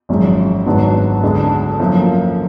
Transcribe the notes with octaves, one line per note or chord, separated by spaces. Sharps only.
G#1 F#2 F3 G#3
G#1 G#2 F#3 B3 D4
D2 D3 G#3 D4
F#2 F3 A#3